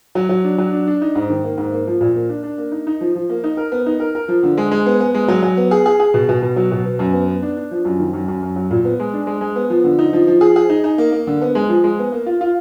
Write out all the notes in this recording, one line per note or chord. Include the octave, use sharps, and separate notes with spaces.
F#3
F#3
D4
F#3
D4
D4
D#4
G#2
D#3
A#3
G#2
A#3
F3
A#2
A#3
D4
D4
A#3
D#4
D#4
F3
F3
A#3
D#4
A#4
B3
D#4
A#4
A#4
F3
D3
G#3
G#3
B3
B3
G#3
F#3
F#3
B3
G#4
G#4
G#4
B2
B2
B2
F#3
B2
B3
F#2
B3
B3
D4
D4
F3
F#2
D#3
F#2
F#2
F#2
F#3
A#2
B3
G#3
D4
G#3
G#3
B3
F3
D3
D#4
F3
F3
G#4
G#4
D#4
D#4
A#3
A#3
D3
B3
G#3
F3
G#3
B3
A#3
F4
F4